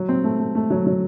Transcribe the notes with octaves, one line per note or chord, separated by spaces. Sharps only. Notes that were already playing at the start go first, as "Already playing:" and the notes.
Already playing: F#3
C4
A3
A3
A3
F#3
F#3